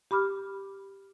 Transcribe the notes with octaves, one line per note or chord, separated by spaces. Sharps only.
G4 B5 D6 F6